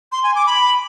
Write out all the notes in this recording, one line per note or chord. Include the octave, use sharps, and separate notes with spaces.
C6
G#5
D6
B5